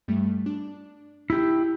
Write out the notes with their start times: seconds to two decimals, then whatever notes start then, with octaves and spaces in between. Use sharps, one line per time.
0.08 G2 G3 A3
0.46 D4
1.30 D#4 E4 G4